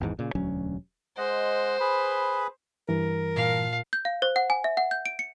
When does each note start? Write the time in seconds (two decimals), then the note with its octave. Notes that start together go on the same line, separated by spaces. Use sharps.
0.01 G#1 E2 G#2 E3
0.19 A#2 C#3
0.35 E1 D2 F#3 C#4
1.18 G#3 C5 D#5 F#5
1.80 G#4 B4 B5
2.89 G2 E3 A#4
3.36 A#2 F5 A5
3.93 G6
4.05 F5
4.22 C5
4.36 F#5
4.50 G#5
4.64 E5
4.77 F#5
4.91 G6
5.06 D7
5.19 C#7